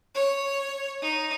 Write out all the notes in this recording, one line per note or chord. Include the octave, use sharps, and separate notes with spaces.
C#5
D#4